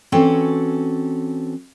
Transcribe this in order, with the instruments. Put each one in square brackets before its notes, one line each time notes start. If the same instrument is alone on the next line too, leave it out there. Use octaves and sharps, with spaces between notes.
[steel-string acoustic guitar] E3 C4 C#4 F#4 A4